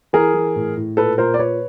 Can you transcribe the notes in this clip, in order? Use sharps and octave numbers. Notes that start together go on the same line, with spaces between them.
E3 G#4 A#4
E3
A2
A2
A#2 A4 B4
A#2 A#4 C5
D5
A#2 B4 C#5